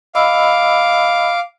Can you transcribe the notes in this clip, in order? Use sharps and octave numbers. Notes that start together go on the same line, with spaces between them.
D#5 F5 B5 D6 E6